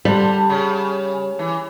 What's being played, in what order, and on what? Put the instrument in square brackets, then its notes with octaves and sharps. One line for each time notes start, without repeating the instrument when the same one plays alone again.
[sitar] D3 [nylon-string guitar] G3
[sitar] C#3
E3